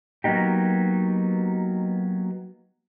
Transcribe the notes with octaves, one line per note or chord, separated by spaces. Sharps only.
F#3 A#3 B3 D#4 G4